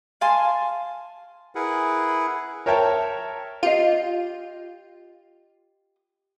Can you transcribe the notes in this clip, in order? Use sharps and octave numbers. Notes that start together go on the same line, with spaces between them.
F5 G#5 A5 C6
E4 G#4 A#4 B4 F#5
A#4 C#5 E5 G5 A5
F4 G4 D#5